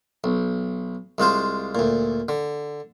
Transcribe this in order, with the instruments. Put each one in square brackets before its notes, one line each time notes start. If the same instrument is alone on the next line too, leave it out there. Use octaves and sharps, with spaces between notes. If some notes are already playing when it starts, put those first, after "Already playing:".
[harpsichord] B1
C2 G#3 F4 C5
D2 A#2
D3